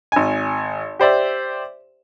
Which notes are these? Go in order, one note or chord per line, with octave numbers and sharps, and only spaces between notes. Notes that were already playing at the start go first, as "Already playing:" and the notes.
G#1 G#5
G4 C5 D5 E5